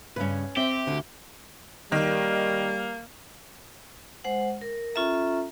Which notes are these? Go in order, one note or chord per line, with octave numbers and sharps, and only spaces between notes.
G2 A#2 C#3 C#4 B4
C4 G4 E5
D2 D3
D#3 G3 A#3
G#3 C5 F#5
A#4
C#4 F4 A4 E5 A#5